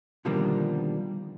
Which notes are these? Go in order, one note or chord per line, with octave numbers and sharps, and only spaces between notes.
B2 D3 D#3 F3 G3 A#3